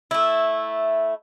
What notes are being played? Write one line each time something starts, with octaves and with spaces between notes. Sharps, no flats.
A3 E4